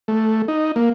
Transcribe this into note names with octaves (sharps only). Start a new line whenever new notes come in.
A3
D#4
A#3